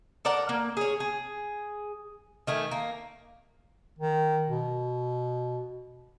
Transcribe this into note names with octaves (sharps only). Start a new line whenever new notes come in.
A4 A#4 D5 F#5
A#3
G#4 C#5
G#4
D#3 A3 G#5
A#3
D#3
B2